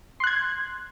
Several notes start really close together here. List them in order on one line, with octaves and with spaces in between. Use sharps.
C6 F#6 G#6